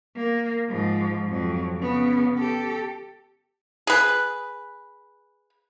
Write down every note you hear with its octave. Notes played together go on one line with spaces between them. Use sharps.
A#3
G#2 F3
F2 F#3
C#3 B3
G4 A4
G#4 B4